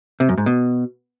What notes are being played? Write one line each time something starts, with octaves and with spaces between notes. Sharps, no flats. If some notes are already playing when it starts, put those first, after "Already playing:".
C3
F#2
G#2
B2